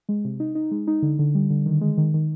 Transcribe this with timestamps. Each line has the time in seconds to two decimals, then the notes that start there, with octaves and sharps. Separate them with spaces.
0.09 G#3
0.25 C3
0.40 D#4
0.55 D#4
0.71 G#3
0.87 D#4
1.02 D3
1.19 D3
1.35 G3
1.50 D3
1.66 D#3
1.81 G#3
1.98 D#3
2.14 D#3